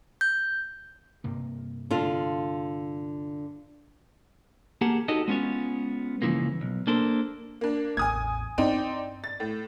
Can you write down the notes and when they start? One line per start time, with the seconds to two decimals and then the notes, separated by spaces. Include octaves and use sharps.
0.21 G6
1.24 G2 C3 A#3
1.91 D3 F4
4.81 A#3 G4 G#4 A#4 F#5 A5
5.08 D#4 F#4 G4 A4 C#5 D#5
5.28 G#3 B3 C#4 F4 C#5
6.22 C#2 G2 C#3 E3 F3 A#3
6.61 B1
6.87 A#3 D4 A4 A#4 C5
7.61 A#3 D4
7.97 A1 E2 G#5 D#6 G#6
8.58 G2 C4 D#4 D5
9.24 A6
9.40 A2